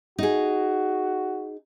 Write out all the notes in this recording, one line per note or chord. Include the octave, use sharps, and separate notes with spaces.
D#4 F#4 G#4